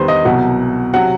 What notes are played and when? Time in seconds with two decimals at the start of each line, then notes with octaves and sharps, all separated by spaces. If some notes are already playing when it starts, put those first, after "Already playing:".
Already playing: E2 D#3 G3 B4 C5
0.08 D#5
0.25 C2 B2 F#3 F#5
0.94 C3 F#3 F#5